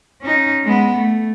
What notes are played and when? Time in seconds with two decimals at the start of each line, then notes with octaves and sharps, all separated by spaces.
0.22 C#4 D#4
0.64 G#3 B3
0.96 A3